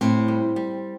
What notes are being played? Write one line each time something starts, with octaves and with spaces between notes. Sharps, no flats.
A2 C4
G3
G3